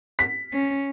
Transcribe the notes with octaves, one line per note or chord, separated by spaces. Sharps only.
B6
C#4